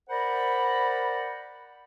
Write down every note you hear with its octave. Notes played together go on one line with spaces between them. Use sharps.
A#4 C5 D5 F#5 B5